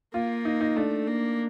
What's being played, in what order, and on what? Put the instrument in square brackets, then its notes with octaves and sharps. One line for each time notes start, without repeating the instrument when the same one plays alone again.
[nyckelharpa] A#3 [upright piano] F4
[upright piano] D#4
D#4
[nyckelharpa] A3 [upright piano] D4
[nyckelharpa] A#3